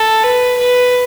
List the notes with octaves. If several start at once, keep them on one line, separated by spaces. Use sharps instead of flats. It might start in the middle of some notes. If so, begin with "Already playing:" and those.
Already playing: A4
B4
B4